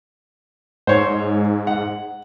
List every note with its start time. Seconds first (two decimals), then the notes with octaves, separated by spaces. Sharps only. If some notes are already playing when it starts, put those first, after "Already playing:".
0.87 G#2 C5 C#5
1.67 F#5